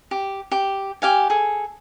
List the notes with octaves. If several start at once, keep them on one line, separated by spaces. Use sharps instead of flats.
G4
G4
G4 F5 G#5
G#4 A4